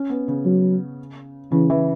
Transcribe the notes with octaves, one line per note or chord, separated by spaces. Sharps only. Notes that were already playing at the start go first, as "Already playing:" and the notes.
Already playing: C#4
B3
C#3
F#3
C#3 E3
E3